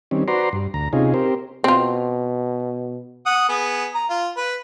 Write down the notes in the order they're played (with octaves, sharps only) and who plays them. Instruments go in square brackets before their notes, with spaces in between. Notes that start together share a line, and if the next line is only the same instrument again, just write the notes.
[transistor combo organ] D#3 G3 C4 C#4
F#4 B4 C5 D5 A#5 C6
G2
D2 A#5
C3 C#4 D#4 F4 G#4
C4 G4 A#4 C5
[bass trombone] B2 [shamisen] C4 F4
[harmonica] F#5 D#6
B3 G#4
A#5
F4
B4